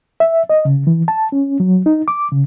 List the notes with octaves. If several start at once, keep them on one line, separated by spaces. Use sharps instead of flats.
E5
D#5
C#3
E3
A5
C#4
F#3
D#4
D6
C#3